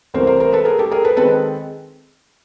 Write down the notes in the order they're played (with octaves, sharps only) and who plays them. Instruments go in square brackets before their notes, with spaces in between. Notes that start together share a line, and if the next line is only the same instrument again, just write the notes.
[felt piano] C2 C3 E3 A3 A#4 C5
A#4 C5
A#4 C5
A4 B4
G#4 A#4
G4 A4
G#4 A#4
A4 B4
D#3 G#3 C4 A4 B4